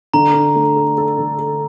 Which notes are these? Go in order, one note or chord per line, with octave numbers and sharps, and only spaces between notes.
D3 A#5
D4
A3
A4
A4
D3
A4